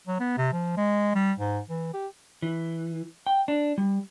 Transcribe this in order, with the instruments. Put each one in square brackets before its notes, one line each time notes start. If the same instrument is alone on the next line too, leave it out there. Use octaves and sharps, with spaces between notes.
[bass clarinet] F#3
B3
C3
F3
G#3
G3
G#2
E3
G4
[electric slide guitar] E3
G5
D4
G3